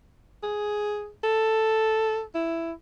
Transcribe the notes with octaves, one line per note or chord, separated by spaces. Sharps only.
G#4
A4
E4